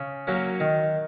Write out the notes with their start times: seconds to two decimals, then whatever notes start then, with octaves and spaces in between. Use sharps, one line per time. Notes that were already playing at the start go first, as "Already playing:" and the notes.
Already playing: C#3
0.27 F#3 A#3 C#4
0.60 D#3